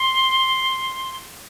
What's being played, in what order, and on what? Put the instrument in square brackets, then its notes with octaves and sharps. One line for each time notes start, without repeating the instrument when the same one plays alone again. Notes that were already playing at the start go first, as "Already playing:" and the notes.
Already playing: [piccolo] C6